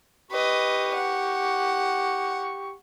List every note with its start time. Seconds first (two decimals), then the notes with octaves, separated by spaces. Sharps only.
0.31 G4 B4 D#5 C#6
0.94 F#5